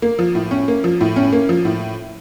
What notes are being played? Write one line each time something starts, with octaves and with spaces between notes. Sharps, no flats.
A#3
F3
A2
C#4
A#3
F3
A2
C#4
A#3
F3
A2